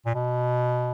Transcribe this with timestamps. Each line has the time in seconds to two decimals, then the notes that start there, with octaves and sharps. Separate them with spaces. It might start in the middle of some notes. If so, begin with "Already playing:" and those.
0.06 A#2
0.15 B2